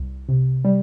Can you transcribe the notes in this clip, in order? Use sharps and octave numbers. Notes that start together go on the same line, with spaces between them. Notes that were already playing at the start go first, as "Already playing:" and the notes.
Already playing: C2
C3
G3